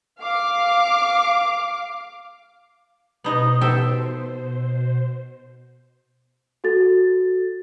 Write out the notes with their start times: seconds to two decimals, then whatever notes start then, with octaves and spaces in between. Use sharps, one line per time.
0.20 F5 D6
3.24 B2 B3 D#4 C5 D#5
3.61 A4 E5 G5
6.64 F#4 A4 A6